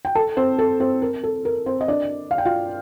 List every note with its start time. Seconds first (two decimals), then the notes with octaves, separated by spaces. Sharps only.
0.05 G5
0.15 A4 A5
0.37 C4 C5
0.59 A4
0.80 C4 C5
1.02 A#4
1.24 A4
1.45 A#4
1.66 C4 C5
1.81 D#5
1.88 D4 D5
2.31 F5
2.38 G5
2.45 F4 F5